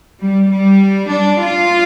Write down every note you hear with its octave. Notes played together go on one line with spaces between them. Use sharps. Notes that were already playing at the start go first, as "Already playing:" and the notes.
G3
G3
D4
F4